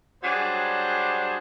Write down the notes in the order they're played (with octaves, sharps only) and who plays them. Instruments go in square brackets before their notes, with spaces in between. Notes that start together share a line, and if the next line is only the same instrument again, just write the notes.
[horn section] F#3 G3 D4 G#4 C5